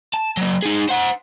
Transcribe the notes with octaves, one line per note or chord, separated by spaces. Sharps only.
A5
F#3 A#3
D#4 G#4
C5 F#5